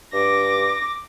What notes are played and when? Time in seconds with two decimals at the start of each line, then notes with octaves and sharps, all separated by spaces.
0.13 G2 D6 A#6